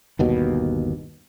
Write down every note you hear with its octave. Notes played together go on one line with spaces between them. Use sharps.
G1 D#2 B2